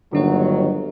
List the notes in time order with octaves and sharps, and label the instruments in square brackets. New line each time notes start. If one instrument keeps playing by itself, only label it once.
[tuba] G1 [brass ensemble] D#2 D#3 F#3 [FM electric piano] D3 D4 C#5